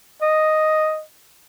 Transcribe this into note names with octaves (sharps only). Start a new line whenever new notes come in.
D#5